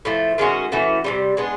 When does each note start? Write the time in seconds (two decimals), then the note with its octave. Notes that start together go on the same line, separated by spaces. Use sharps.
0.05 A2 F3 A3
0.38 D#3 G#3 C#4 F#4
0.72 E3 A3 C#4 F#4
1.04 C3 E3 G3
1.37 G#3 B3 D4